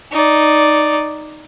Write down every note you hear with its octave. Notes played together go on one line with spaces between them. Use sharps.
D#4 D5